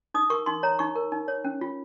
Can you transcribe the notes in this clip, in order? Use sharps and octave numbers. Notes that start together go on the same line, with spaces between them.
D#4 D#6
A#4 C#6
D#4 C6
C#5 A#5
D#4 C#6
A#4
D#4
C#5
C#4
F4